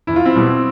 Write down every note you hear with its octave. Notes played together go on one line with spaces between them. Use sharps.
E2 E4
F4
C4 E4
B2 G3